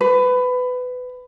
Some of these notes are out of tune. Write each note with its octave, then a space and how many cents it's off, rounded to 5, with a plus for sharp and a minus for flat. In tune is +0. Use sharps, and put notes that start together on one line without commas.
B4 +20